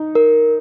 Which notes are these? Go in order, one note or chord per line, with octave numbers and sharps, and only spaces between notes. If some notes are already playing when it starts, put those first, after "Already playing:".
Already playing: D#4
A#4